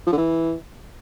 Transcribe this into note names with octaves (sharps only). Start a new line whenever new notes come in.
F3
D3
E3